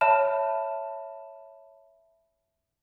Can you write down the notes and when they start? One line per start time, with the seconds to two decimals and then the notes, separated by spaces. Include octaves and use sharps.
0.01 C#5 E5 A5 B5 F6 E7